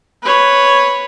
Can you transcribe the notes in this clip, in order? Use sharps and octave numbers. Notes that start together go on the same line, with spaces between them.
B4 C#5